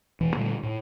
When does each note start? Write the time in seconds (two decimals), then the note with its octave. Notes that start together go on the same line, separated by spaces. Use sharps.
0.21 E1 E3
0.37 A#2 D3 G3 A3
0.63 A2